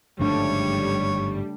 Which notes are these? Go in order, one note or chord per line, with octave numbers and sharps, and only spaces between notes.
G1 G#2 C#3 F3 G3 A3 D4 C#5